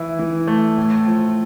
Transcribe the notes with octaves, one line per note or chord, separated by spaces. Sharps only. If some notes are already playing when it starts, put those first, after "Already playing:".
Already playing: E3 E4
E3
A3
A2
F3